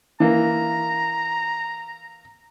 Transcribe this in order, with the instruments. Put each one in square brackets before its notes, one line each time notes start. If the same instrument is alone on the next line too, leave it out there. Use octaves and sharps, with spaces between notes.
[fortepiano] E3 A#3 [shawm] A#5